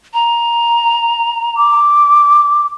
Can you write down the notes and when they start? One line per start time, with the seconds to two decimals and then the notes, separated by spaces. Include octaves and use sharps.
0.14 A#5
1.57 D6